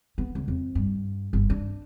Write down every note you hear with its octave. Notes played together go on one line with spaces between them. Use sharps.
B3
C#2
F2
G2
G1
D4